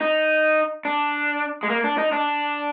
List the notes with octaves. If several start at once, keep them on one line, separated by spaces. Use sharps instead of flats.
D#4
D4
G#3
A#3
D4
D#4
D4